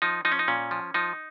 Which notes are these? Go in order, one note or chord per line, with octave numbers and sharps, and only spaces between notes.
F3 D#4
F3 D#4
C#4
D#4
A#2 C#4
F3
F3 D#4